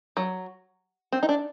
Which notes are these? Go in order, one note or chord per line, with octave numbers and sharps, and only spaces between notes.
F#3
C4
D#4
D4